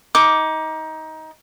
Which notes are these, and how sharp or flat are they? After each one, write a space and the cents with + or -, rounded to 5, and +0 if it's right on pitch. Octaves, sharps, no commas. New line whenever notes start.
D#4 +20 D6 +0